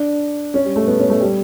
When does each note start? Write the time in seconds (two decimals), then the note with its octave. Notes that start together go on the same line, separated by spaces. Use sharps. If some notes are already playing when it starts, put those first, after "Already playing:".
Already playing: D4
0.54 C#4
0.65 G3
0.76 A3
0.87 B3
0.99 C#4
1.10 A3
1.21 G3